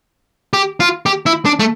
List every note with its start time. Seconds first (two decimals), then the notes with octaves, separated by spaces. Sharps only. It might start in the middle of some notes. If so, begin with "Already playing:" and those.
0.54 G4
0.80 F4
1.06 G4
1.26 E4
1.46 D4
1.59 A3